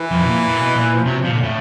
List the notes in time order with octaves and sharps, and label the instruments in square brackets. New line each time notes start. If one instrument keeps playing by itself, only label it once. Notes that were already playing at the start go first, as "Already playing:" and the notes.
Already playing: [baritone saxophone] E3
[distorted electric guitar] F2
B2
A#2
A#2
B2
A#2
[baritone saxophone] F3
[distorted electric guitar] C3 [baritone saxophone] F#3
[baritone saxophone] F3
[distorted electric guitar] A#2
[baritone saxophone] D3
[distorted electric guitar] A2